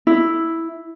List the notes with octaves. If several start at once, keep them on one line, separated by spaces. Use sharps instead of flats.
E4